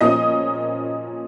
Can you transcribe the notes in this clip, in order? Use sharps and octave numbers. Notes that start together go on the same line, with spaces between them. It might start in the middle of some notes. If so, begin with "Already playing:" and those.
A#2 F3 A#3 C#4 D#5 D#6